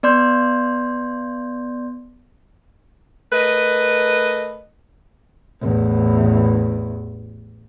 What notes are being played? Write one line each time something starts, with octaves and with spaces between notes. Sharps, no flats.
B3 D5 C6 G6
A3 A#4 B4 D#5
A1 E2